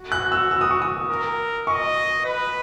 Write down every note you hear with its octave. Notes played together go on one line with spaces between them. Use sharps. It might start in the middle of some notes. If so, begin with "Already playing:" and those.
Already playing: F#4
F#6
E6
E6
D#6
C#6
D#6
A#4
D#5 C#6
B4